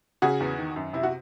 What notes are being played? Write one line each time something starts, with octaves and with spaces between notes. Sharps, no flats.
C#3 F#4 G#4
E2
D#3
F#2
C3 E4
F#4